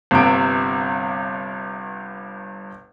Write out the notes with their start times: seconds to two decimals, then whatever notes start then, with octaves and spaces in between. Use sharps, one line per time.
0.11 G1 G2 C3 D7